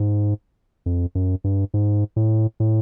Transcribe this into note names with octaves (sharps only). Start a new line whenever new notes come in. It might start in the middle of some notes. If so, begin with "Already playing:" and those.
Already playing: G#2
F2
F#2
G2
G#2
A2
A2